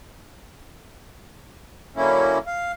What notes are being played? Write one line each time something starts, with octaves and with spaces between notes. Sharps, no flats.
D3 F#3 A#3 C#4 E4
F5